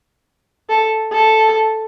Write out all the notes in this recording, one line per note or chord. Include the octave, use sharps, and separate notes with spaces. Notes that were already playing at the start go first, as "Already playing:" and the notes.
A4
A4